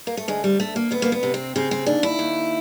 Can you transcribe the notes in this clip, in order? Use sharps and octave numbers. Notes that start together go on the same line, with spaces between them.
A#3
A3
D2 G#3
G3
D2 A3
A#3
D2 B3
A#3
B3
C3
C4
C#3 C4
C4
D#2 D4
E4
D#2